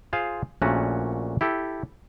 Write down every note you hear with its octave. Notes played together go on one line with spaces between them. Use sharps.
F4 G#4 C5 F5
A#1 A#2 A3 C#4 F#4 F#5
E4 G4 A4